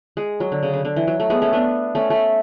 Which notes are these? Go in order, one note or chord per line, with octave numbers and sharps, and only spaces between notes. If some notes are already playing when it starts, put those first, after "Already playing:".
G#3
F#3
D3
C#3
D3
D3
E3
F#3
A3
G#3 B3
A3 C#4
B3 D4
A3 C#4
A3